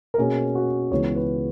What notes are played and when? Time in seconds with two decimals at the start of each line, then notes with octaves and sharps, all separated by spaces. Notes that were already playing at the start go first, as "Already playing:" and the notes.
0.14 A#4
0.18 B2 A#3 C#4 G#4
0.55 F#4
0.91 C#2 C#3 E3 B3 C#5
1.15 B4